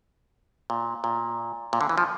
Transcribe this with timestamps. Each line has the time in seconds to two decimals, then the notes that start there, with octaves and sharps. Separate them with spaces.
0.70 A#2
1.04 A#2
1.73 A#2
1.81 D3
1.89 E3
1.98 F3